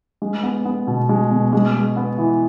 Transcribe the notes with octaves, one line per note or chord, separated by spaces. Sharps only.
G#3
B3
B3
B2
G#3
B2
G#3
G#3
B3
E3